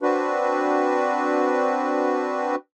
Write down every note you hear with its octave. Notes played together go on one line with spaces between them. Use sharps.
C4 D4 F#4 B4